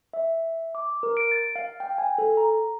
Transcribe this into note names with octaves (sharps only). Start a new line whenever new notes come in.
E5
D6
A#4
D7
A6
F5
G5
G#5
A4
A#5